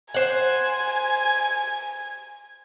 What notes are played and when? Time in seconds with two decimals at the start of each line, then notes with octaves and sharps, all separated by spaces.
0.14 C5 F#5 G#5